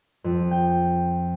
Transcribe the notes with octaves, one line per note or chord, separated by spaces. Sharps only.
F2
G5